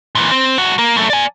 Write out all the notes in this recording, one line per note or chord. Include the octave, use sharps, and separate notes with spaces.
A#2 E3
C4
G2 F#4
A#3
F#2 A3
D5 G#5